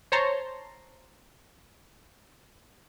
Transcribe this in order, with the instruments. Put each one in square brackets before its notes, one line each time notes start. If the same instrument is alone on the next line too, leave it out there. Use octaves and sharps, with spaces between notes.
[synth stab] C5 C#5 A5 A#5 C6